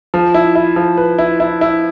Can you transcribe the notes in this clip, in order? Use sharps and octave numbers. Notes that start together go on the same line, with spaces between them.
F3
E4
E4
F3
B4
E4
E4
E4